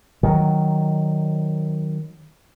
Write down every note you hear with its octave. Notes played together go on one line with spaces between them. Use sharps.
D#3 F#3